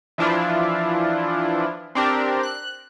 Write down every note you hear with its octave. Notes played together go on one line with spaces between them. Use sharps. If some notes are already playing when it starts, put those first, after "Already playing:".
E3 F3 D4 E4 F4
C4 D4 G4 A#4
F#6